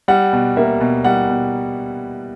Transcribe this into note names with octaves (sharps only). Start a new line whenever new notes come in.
G3 F#5
B2
A#3 E5
B2
G3 F#5
B2